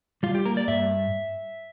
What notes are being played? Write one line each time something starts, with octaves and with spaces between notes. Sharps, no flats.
G3 F4
G4
A#3 A#4
D5
G2 E5